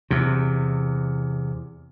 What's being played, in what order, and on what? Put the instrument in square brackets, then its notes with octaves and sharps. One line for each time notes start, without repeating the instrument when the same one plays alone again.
[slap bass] E2 C3